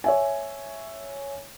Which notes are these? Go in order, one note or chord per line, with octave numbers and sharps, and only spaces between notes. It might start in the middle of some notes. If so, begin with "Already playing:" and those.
C#5 E5 G#5